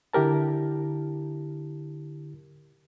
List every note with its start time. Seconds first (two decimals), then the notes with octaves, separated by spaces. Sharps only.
0.13 D3 E4 G4 A#4 A5